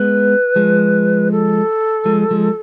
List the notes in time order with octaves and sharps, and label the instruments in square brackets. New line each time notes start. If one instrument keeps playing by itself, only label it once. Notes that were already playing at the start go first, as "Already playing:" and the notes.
Already playing: [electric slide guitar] G#3 B3 [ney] B4
[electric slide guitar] F3 G#3
[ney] A4
[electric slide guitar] F3 G#3
F3 G#3